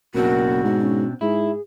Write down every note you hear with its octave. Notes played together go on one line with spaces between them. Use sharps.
F#1 B2 C4 D4 F#4 A#4
G#2
C#4
G#2 E4 G#4